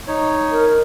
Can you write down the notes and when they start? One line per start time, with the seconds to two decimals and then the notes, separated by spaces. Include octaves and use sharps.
0.08 D#4 C#5
0.51 A#4